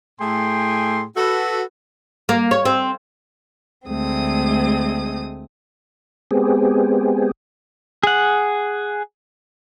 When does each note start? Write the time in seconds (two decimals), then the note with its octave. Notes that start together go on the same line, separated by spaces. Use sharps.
0.20 A2 A3 G#4 G5 G#5 C6
1.16 F#4 A4 B4
2.29 A#3
2.51 C#5
2.65 C4
3.88 D2 G#3 A3 C4 D#6
6.31 G#3 B3 C4 G4 G#4
8.03 G#4 F#5